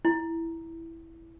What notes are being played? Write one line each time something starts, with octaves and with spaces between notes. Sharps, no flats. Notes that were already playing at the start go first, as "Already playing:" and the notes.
E4